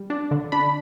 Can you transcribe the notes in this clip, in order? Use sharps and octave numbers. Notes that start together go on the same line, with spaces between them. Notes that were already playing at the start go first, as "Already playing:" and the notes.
Already playing: G3
D4
D3
D4 B5